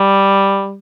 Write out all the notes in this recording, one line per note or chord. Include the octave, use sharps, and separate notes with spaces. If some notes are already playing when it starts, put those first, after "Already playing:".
Already playing: G3